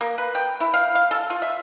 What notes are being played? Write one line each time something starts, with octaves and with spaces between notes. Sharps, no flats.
A#3
B4
G5
E4
F5
F5
A4
F4
E5